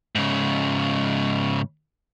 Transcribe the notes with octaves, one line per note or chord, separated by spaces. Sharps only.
G#2 C#3